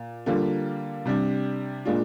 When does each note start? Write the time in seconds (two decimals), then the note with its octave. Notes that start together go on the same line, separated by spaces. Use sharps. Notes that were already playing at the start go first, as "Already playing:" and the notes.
Already playing: A#2
0.26 D3 G3 A#3 F4
1.05 C3 G3 D4
1.86 A#2 G#3 D4 F4